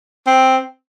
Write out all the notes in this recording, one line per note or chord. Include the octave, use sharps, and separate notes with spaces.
C4